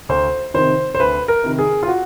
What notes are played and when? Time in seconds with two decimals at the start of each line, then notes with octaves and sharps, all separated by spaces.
0.09 D2 C5
0.54 C3 D#3 C5
0.95 C5
1.00 D2 B4
1.28 A#4
1.44 C3 D#3
1.59 G#4
1.83 F4
1.88 F#4